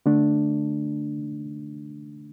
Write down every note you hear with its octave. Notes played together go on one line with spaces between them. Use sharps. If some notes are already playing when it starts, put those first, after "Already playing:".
D3 A3 D4